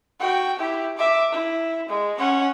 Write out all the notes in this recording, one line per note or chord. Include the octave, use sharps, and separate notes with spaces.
F#4 G5
E4 G4
E5 D6
E4
G#3
C#4 F#5